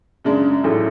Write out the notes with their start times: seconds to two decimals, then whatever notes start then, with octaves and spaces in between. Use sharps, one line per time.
0.25 F#2 C#3 G#3 D4
0.64 A1 G#2 F#3 A3 E4